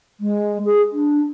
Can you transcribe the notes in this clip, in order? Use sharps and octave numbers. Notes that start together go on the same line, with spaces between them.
G#3
G#4
D4